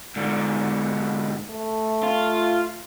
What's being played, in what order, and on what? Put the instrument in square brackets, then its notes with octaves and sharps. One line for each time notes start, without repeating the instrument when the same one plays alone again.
[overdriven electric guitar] G#2 D3
[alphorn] A3
[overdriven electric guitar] F4